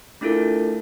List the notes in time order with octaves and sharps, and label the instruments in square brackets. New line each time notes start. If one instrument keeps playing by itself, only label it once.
[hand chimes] A3 D4 E4 F4 A4 A#4